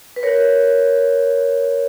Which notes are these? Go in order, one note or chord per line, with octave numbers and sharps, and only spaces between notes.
B4
A#4 C#5